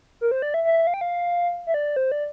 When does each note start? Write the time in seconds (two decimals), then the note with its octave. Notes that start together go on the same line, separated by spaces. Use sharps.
0.21 A#4
0.31 C5
0.42 D5
0.54 E5
0.65 E5
0.87 F5
0.94 G5
1.01 F5
1.67 E5
1.74 D5
1.96 C5
2.12 D5